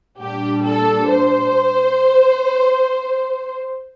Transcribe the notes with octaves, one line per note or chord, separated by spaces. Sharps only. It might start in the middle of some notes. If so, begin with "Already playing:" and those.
A#2 G3 D4 G4
A4
C5